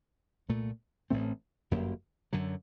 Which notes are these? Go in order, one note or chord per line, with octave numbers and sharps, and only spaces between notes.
C2 A#2 A3
A1 A2 A3 C4
G1 F#2 F#3 A#3
F#2 D3 F#3